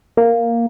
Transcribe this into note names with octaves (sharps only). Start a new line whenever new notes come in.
A#3